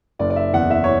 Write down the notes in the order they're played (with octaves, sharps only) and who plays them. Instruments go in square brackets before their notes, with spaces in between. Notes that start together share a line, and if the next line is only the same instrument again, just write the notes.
[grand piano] F#1 D5
D5
E5
E2 F#5
E5
C#5